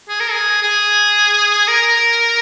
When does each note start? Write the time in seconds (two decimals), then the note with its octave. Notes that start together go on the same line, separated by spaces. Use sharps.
0.09 G#4
0.20 A#4
0.31 G#4
0.62 G#4
1.68 A#4